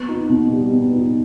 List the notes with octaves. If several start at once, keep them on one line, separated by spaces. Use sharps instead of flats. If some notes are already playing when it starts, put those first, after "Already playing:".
Already playing: B3
D#4
B2
G3
B3
D#4